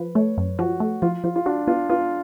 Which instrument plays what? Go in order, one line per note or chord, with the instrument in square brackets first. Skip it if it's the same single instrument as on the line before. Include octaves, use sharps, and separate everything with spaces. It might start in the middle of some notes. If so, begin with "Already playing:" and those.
Already playing: [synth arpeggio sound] F3 [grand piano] B4
[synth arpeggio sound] A3 [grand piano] C#5
[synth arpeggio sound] F#2
[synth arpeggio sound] F3 [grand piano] F#4
[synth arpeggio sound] A3
[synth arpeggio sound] F3 [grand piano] F4
[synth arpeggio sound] F3 [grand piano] F4
[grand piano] F4
[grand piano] D4 [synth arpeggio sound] F#4
[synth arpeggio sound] B3 [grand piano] F4
[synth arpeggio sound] B3 [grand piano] F4